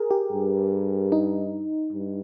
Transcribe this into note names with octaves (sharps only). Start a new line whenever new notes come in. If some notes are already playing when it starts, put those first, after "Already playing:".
Already playing: G#4 A#4
G4
G2
D#4
G2